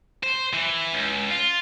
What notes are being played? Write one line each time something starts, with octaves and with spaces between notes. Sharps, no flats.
C5
E3
C#2
F4